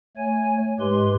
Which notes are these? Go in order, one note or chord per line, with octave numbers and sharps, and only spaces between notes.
A3 C#5 G#5
G#2 G#3 G4 B4 C6